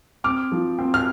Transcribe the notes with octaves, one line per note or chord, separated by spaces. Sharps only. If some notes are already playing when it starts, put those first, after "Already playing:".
C4 D6 F6
F3
C4
F6